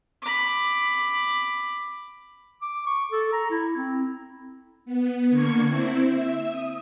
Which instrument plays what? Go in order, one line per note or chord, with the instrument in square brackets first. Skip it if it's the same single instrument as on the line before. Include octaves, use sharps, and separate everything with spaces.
[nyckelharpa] B5 D6
[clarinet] D6
C#6
A4
A#5
E4
C4
[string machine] B3
D3 A#3 C#6 G#6
C4 E4
E5
D#6